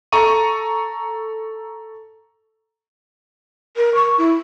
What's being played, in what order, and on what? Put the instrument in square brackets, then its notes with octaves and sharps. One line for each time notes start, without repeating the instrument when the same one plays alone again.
[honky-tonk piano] A4 A#5 C#6 D#7
[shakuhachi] A#4
C#6
E4